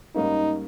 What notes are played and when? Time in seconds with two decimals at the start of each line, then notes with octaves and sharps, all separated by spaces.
0.15 G#2 G3 A#3 C#4 D#4